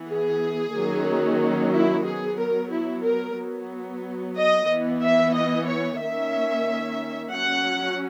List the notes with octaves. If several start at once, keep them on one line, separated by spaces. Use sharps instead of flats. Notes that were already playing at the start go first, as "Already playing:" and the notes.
Already playing: E3 B3
G#4
D#3 F#3 A#3 C#4
E4
F#3 B3 G#4
A#4
E4
A#4
F#3 B3
D#5
E3 B3
E5
D#5
C#5
D#3 A#3 C#4 E5
F#3 C#4 F#5